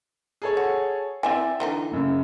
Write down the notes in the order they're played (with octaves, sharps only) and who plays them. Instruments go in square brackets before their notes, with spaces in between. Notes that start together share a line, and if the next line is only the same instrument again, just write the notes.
[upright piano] G#4 A4 C#5
[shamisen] F#4
[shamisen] C4 E4 G#5 [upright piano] D5 E5 G5
[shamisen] D3 E3 D#4
[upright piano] F#1 F#2 C#3